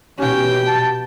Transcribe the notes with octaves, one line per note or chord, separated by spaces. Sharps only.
B2 C#4 G4 G5
A5